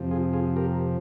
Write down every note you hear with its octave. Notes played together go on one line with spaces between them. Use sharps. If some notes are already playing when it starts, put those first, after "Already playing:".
Already playing: F2 C3 F3
F4 G#4
F4 G#4
G4 A#4